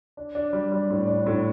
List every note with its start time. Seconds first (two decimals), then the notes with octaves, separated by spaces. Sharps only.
0.17 D4
0.35 D4
0.53 G3
0.72 G3
0.90 A2
1.07 D4
1.26 A2